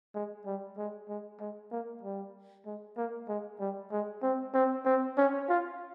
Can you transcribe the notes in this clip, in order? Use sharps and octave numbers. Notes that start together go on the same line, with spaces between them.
G#3
G3
G#3
G#3
G#3
A#3
G3
G#3
A#3
G#3
G3
G#3
C4
C4
C4
C#4
F4